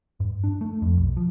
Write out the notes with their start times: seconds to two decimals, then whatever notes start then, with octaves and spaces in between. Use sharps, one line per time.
0.20 G2
0.44 D4
0.61 A3
0.82 F2
0.97 B1
1.17 F3